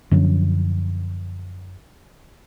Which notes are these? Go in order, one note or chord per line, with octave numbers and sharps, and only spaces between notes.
F#2 D3 F3 C#4